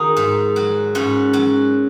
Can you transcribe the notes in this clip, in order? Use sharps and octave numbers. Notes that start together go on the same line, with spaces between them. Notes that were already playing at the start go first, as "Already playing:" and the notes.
Already playing: D#3 D#4 F#4 G#4 A#4
G#2
F#3
G#2 C#4 F#4
F#3